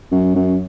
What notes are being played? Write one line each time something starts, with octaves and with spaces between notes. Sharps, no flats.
F#2
F#2